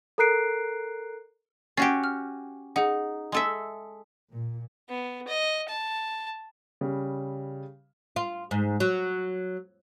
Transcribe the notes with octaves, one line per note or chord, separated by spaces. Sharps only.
A4 A#4 A#5 F#6 C7 D7
C#4 F#4 G4 A6 C7
F6
D#4 G#4 F#5
G#3 A4 E5
A#2
B3
D#5
A5
C#3 G3
F4
G#2
F#3